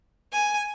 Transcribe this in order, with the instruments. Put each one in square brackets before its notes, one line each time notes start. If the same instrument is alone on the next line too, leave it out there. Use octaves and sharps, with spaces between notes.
[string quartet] G#5